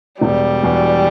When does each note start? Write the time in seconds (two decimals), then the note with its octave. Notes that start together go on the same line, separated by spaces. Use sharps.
0.21 E1 G3
0.63 E2 B2